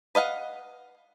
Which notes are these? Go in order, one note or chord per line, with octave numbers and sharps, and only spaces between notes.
B4 D#5 F5 F#5